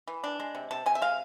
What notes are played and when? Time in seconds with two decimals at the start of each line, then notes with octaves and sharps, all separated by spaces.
0.08 E3
0.24 D4
0.40 G#3
0.55 C3
0.71 C3 A5
0.86 C3 G#5
0.95 E5
1.02 G#3 F5